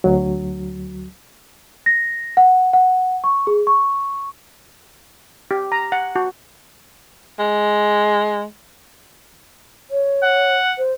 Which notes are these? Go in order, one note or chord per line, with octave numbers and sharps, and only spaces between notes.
D2 F#3
A#6
F#5
F#5
C#6
G#4
C#6
G4
A#5
F#5
F#4
G#3
C#5
F#5
C5